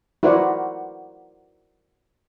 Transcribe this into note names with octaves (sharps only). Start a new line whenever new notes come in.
E4 F#4 A#4 C5 D5 F#5